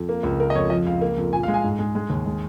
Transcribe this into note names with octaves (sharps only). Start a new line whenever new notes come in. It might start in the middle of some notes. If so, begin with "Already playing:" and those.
Already playing: F2
A#3
C#2
A#3 A#4
D#5
F2 C#5
F3 D#5
C#2 F5
A#3
F2
A#2 G#5
F5
G#3
G#5
G#2
G#3
G#3
D#2
G#3